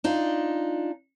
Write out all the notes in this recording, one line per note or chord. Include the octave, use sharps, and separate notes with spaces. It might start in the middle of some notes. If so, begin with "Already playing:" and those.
D4 D#4 F4